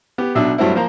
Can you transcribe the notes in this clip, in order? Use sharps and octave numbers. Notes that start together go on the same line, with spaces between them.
B3 G4
B1 B2 D4 E5 E6
G2 F#3 A3 C4 E4
F3 A#3 C5 A#5